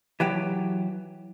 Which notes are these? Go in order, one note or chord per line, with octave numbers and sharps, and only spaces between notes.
E3 F#3 G4